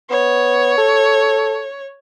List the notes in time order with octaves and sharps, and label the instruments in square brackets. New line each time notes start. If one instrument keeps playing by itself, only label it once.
[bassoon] B3 [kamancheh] C#5
[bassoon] A4